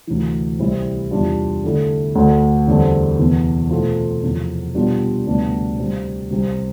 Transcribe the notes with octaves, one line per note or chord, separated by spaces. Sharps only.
D2 C3 E3
C2 C3 G3 C4 E4
E2 C3 G3 D4 F4
D3 A3 E4
D2 D3 A3
E2 D3 G3 C4
E2 C3 E3 B3
B2 A3 C4 F4
E2 C3 F3
B2 G3 B3 D4 F4
D2 C3 G3 B3 D4
C3 G3 C4
C2 C3 G3 C4